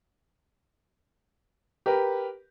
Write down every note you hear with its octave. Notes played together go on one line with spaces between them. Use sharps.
G4 A#4 B4